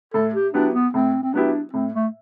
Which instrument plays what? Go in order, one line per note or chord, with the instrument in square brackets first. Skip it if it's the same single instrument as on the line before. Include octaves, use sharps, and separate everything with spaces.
[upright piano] A2 [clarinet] A4
[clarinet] G4
[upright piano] F#3 B3 E4 G4 [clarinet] D4
[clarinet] B3
[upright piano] A2 [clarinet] C4
[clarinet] C4
[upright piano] F#3 B3 E4 G4 [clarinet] D4
[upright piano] A2 [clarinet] C4
[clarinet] A3